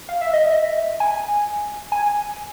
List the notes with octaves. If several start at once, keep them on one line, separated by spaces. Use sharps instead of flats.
F5
E5
D#5
E5
G#5
G#5